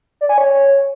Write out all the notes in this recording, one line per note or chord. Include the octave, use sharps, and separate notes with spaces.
D5
G#5
C#5